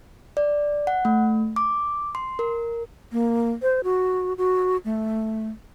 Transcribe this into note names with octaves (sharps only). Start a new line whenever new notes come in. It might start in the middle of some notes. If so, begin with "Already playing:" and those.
D5
F#5
A3
D6
C6
A#4
A#3
C5
F#4
F#4
A3